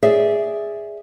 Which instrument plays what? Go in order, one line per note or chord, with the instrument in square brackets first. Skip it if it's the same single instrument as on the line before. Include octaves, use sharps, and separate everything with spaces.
[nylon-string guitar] G#4 D5 E5